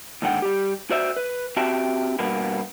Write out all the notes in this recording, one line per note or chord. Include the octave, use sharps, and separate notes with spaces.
D#2 G#2 D3 F#5 G5
G3 G4
F#4 C5 D5 E5
B4
C4 F#4 G4 E5 G5 A5
G2 B2 A#3 B3